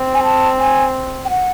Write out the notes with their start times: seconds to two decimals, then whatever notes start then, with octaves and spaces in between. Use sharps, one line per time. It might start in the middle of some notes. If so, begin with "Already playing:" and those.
Already playing: C4
0.14 G#5
0.24 A5
0.59 G#5
1.25 G5
1.30 F#5